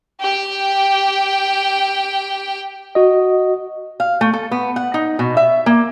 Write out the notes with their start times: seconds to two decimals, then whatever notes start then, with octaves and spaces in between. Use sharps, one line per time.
0.20 G4 G5
2.95 F#4 D#5
4.00 F5
4.21 A3
4.33 A4
4.51 B3
4.76 F#5
4.94 D#4
5.19 B2
5.37 E5
5.66 A#3